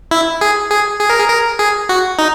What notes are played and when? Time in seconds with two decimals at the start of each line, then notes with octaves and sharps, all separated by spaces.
0.11 E4
0.41 G#4
0.70 G#4
0.99 G#4
1.10 A#4
1.19 G#4
1.29 A#4
1.59 G#4
1.89 F#4
2.19 D#4